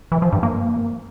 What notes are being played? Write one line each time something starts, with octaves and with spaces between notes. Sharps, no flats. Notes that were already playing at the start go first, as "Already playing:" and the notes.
E3
F3
G2
A#3